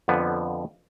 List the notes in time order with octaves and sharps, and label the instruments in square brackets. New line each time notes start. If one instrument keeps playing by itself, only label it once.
[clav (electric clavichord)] F2 D3 F3 B3